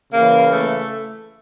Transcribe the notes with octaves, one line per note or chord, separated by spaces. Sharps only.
C#3 E3 A#3
A3